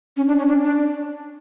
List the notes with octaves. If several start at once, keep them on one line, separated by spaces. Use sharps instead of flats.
C#4
D4
C#4
D4
D4